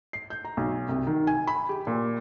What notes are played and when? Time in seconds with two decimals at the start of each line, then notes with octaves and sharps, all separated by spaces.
0.13 C7
0.30 G6
0.45 A#5
0.57 B1
0.89 C2
1.07 D#3
1.27 G#5
1.47 B5
1.69 G4
1.87 A#2